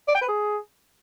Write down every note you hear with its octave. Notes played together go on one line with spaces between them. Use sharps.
D5
G5
B4
G#4